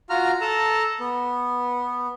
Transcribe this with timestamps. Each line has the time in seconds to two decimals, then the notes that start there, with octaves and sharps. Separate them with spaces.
0.10 F4 F#4 A#5 F6
0.41 A4 A5 A#5
1.00 B3